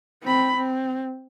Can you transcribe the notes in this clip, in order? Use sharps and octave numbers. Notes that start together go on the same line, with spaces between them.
C4 B5
C4